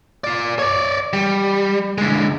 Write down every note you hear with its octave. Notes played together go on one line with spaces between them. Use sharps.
F4 D5
C#5 D5
G3
D3 G#3